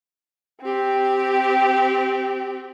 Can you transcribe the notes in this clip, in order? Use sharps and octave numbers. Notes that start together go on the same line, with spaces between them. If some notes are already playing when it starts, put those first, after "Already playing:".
C4 G4